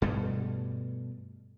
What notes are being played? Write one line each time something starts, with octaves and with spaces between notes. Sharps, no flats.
G2 B2 G3 A3